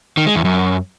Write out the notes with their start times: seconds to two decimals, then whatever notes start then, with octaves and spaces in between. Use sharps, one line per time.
0.17 D#3
0.26 G#3
0.36 E2
0.45 F#2